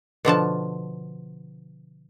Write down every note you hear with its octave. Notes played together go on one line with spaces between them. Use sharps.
B2 D3 F3 A5